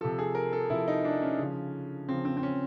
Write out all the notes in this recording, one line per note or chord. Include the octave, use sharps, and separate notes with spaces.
C3 F3 A4
G#4
A#4
A4
C3 F3 E4
D#4
D4
C#4
C#3 F3
C#3 F3 C4
C4
C4
C#4